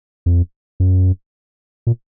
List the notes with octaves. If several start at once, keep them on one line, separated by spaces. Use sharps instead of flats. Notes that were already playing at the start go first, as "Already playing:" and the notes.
F2
F#2
A#2